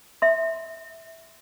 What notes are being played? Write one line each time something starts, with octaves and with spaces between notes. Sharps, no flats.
E5 C6